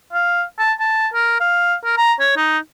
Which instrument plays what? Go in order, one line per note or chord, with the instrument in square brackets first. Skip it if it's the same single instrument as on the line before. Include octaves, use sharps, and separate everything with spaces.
[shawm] F5
A5
A5
A#4
F5
A#4
A#5
C#5
D#4